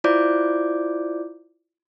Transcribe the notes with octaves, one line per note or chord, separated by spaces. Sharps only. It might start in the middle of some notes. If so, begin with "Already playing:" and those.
E4 F4 C5 D5 D6 G6